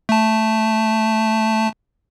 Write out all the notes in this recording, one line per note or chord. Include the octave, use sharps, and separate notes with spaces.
A3 A5